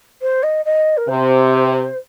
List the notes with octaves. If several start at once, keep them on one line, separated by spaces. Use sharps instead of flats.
C5
D#5
D#5
A#4
C3 C5